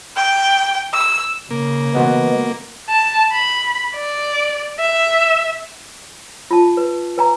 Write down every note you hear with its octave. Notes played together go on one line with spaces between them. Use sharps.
G5
E6
C#3 A#3
E3 G#3 B3 F#4 C5
A5
B5
D5
E5
F4 A5
B4
B4 G#5 A#5